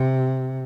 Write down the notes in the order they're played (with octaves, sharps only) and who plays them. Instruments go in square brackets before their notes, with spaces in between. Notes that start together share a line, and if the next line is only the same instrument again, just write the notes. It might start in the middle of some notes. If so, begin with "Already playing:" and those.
Already playing: [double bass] C3